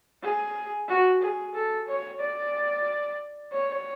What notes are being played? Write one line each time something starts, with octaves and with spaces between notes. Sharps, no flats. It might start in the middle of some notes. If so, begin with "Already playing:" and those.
G#4
F#4
G#4
A4
C#5
D5
C#5